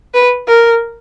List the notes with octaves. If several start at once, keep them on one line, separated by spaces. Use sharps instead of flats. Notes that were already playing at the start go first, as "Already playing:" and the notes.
B4
A#4